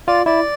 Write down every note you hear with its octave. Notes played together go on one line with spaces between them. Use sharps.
F4 D5
E4 D5